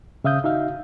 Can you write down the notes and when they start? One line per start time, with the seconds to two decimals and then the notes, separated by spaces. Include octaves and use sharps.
0.24 C#3 E5 F5 D#6 G6
0.44 D#4 F#4 E5 F5